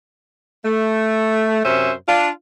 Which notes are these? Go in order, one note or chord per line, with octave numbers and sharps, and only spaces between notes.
A3
F#2 C3 C#4 C5 E5
D4 F4